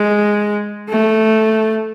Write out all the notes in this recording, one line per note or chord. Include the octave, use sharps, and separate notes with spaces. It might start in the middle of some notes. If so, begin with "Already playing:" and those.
Already playing: G#3
A3